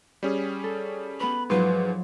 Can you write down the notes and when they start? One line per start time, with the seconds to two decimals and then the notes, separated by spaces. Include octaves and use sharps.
0.23 G3 C#4 G#4
0.64 A4
1.20 B3 B4 B5
1.50 G#2 F3 F#3 B4 C6